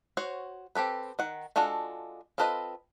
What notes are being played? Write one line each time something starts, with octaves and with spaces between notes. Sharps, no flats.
F#4 C5 C#5
C4 G4 A4 B4
D#3 F#5
G#3 D4 F4 F#4 A4
C4 F4 A4 B4 D#5